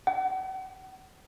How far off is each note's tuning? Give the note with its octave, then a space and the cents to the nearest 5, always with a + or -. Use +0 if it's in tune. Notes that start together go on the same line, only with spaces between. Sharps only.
F#5 +35